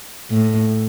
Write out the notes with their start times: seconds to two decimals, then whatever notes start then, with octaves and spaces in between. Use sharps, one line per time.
0.30 A2